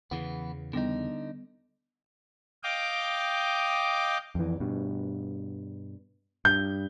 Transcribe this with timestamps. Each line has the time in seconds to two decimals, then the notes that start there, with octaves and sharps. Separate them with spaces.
0.11 E2 C#3 E3 B3
0.73 D3 G3 B3 D#4
2.63 D#5 F5 G5 D6
4.35 F2 E3
4.60 G2 B2
6.45 G2 G6